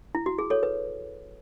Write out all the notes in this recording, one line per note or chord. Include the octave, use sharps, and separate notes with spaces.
E4
F#4
G#4
A4 C#5
B4